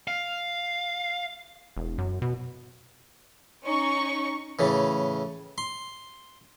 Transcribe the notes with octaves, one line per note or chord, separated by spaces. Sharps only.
F5
E1
F#2
B2
C#4 D#4 C#6
A2 C#3 E3
C6